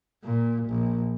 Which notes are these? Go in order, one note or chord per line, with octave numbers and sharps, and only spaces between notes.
A#2
A#1